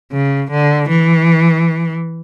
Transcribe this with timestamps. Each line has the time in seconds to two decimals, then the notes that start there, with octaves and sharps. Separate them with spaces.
0.12 C#3
0.51 D3
0.89 E3